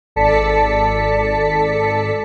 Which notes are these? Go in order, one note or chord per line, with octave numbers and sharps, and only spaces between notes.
G#1 A4 D5 A5 B6 C#7